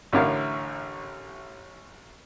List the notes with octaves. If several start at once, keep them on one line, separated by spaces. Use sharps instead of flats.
A1 A2 D3 A#4 C#5 F5